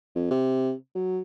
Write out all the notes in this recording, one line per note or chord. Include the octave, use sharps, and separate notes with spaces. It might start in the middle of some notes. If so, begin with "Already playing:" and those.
F2
C3
F#3